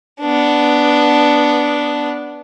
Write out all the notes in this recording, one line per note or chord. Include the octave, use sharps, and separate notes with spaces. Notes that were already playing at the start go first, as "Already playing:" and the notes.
B3 D4